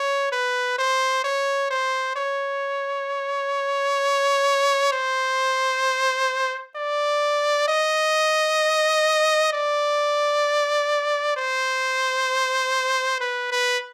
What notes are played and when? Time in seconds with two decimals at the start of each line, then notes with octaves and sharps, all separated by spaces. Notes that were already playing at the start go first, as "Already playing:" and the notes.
Already playing: C#5
0.32 B4
0.79 C5
1.24 C#5
1.71 C5
2.16 C#5
4.93 C5
6.76 D5
7.68 D#5
9.53 D5
11.36 C5
13.21 B4
13.52 B4